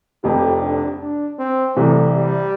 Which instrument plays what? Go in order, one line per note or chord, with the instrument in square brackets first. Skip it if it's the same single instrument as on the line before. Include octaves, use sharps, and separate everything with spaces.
[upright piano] F1 F2 C3 [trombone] G4
[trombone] D4
D4
C4
[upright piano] C2 C3 E3 [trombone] A3
[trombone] G3